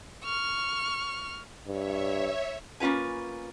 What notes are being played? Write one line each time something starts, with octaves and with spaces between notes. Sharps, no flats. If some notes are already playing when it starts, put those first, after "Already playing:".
C#6 F6
G2 C#5 E5
A#3 C#4 F4 B4 G#5